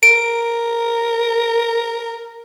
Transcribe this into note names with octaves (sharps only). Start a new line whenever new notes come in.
A#4 D7